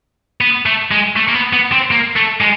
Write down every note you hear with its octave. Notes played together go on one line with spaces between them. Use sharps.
B3
A3
G#3
A3
A#3
B3
B3
C4
A#3
A3
G#3